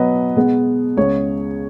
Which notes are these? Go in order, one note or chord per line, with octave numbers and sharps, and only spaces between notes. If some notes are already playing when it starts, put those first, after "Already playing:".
Already playing: B2 F#3 B3 B4 D#5
B2 G#3 B3
C#2 C#3 B3 G#4 C#5